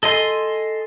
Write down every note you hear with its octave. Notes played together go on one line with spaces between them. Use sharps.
A4 D#5 G#5 C6